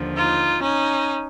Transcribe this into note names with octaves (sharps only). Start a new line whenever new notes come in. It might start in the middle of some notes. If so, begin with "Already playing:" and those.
Already playing: D#2 D3 F3
D#4 F4
C#4 D#4